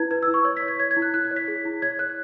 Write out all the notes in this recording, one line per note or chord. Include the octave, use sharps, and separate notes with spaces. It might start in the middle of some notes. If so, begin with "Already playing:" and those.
Already playing: E4 B4 G#6
B4 G#6
E6
E4
C#6
C#5 G#6
B6
C#5
G#6
C#5 G#6
G#6
E4
F#6
E4 F#6
G#6
C#5
B6
G#4
E4
C#5 G#6
C#5 F#6